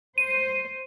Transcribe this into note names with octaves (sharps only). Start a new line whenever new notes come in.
C5 D#7